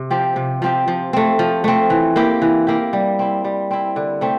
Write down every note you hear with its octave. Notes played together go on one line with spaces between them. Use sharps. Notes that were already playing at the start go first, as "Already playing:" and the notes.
Already playing: C3
F3 C4 G4
C3
F3 C4 G4
F3
A3 C4
F3
A3 C4
E3
A#3 E4 G4
E3
A#3 E4 G4
G3
C4 E4
G3
C4 E4
D3
A3 C4 G4